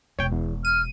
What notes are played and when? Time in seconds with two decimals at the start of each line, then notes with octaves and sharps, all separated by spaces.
0.19 E1 B2 C#5 G5
0.32 E2
0.65 F6 D#7